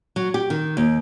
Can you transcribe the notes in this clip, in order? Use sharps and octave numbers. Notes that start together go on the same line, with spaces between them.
F#3
G4
D#3
D#2